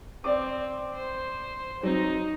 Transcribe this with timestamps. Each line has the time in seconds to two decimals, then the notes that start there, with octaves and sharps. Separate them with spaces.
0.24 C4 D5 D6
0.94 C5
1.83 F#3 C4 D#4